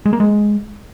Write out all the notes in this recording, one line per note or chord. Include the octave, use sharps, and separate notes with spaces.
G#3
A#3
G#3